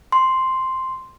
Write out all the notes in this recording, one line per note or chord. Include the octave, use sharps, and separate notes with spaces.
C6